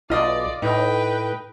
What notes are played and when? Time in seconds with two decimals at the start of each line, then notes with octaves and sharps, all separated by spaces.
0.10 B1 F4 D5 D#5
0.62 A2 D#4 B4 G5